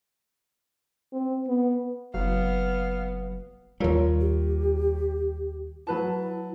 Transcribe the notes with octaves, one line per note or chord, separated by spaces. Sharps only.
C4
B3
F#1 F#3 B3 F5
D#2 G3 F4 A#4 C#5
G4
F#3 E4 B4 A5